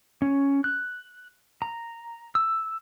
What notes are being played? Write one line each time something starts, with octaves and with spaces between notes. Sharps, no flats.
C#4
F#6
A#5
E6